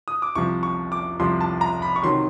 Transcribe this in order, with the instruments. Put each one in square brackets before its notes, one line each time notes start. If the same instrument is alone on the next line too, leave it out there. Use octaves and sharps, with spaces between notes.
[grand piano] D#6
D6
C2 C3 F3 C#6
C#6
D6
C2 C3 F3 C6
A5
A#5
B5
C#6
C3 D#3 F#3 C6